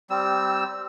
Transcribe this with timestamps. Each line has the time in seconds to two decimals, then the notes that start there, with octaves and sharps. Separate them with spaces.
0.10 G3 C4 E6